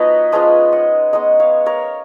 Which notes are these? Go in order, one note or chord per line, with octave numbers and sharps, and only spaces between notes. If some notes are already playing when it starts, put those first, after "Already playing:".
Already playing: F3 B3 D#4 F#4 B4 C#5 D#5
F3 G#3 C#4 F4 B4 D#5
D#5 F#5
G#3 B3 D#4 D#5 F#5
C#5 F5
A#4 C#5